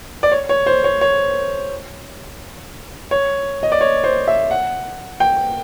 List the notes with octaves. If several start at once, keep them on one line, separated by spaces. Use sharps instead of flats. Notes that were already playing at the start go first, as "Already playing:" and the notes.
D5
C#5
C#5
C5
C#5
C#5
C#5
D#5
D5
C#5
C5
E5
F#5
G5